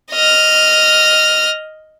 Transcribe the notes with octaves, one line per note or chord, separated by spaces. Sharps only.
D#5 F6